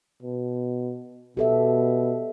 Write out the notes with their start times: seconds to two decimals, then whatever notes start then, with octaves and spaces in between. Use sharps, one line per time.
0.23 B2
1.37 B2 G4 A4 E5